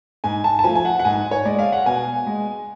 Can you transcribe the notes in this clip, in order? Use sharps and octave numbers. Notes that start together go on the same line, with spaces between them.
G#2 G#5
A5
A5
F3 A3 G#5
G#5
F#5
F#5
G#2 G#5
C#5
G#3 D5
F5
F#5
B2 G#5
G#3